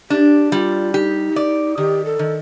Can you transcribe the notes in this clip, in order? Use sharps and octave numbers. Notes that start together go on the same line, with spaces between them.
D4 G4
G3 F4
D#4 G4
D5
D#3 G4
A4
D#3